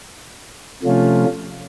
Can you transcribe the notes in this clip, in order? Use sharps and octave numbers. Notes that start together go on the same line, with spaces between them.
C3 F3 A3 C#4 F4